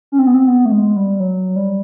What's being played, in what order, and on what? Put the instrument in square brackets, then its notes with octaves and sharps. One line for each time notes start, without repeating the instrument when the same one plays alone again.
[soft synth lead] C#4
C4
B3
C4
B3
A3
G#3
G3
F#3
G3